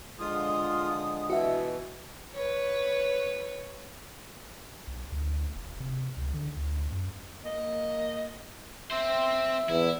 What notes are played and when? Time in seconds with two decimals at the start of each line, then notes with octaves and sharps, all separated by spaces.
0.19 D3 F3 G#3 F4 D#6
1.30 B2 E3 F#4 D#5 E5
2.34 B4 C#5
4.87 B1
5.12 D2
5.56 E1
5.80 C3
6.17 C#2
6.34 D3
6.57 D2
6.92 F#2
7.45 A#3 D#5
8.91 C4 C5 E5
9.69 E2 E4